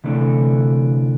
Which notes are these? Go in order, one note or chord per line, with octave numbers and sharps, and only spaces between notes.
D2 C3 E3 A3 D4